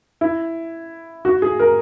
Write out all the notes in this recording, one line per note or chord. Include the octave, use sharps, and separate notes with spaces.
E4
F#4
G#4
A#4